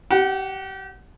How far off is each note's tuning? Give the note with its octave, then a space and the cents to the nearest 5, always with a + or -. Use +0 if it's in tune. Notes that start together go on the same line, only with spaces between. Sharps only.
G4 -30 F#5 +0